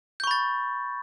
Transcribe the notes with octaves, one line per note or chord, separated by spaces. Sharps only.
B5 C#6 G6 A6